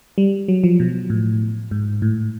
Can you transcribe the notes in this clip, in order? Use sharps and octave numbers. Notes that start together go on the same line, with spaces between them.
G3
F#3
F3
B2
A2
G#2
A2